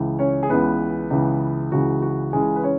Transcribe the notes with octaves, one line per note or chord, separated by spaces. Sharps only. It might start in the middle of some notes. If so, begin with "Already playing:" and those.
Already playing: C#2 C#3 E3
C#4 C#5
G#4
C#2 C#3 E3 B3 B4
C#2 C#3 E3
C#2 C#3 E3 F#4
F#4
C#2 C#3 E3 G#3 G#4
B4
C#4 C#5